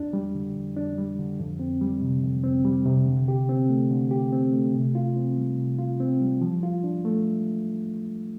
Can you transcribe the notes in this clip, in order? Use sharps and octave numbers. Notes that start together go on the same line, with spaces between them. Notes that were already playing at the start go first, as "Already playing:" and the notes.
Already playing: F2 D4
G3
D3
F2
D4
G3
D3
F2
C4
G3
C3
F2
C4
G3
C3
D3
G4
C4
A3
D3
G4
C4
A3
C3
F4
C4
G3
C3
F4
C4
G3
F3
F4
D4
A3